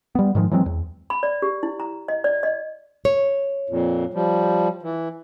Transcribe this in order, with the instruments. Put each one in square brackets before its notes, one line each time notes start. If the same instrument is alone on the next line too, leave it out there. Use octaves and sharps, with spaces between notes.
[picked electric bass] G3 B3
G#2 D#3 F3 G#3
E3 F#3 G#3 C4
E2
[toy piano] B5
D5
G4
E4
A#5
D#5
D5
D#5
[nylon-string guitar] C#5
[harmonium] F2 A#2
F3 G3
E3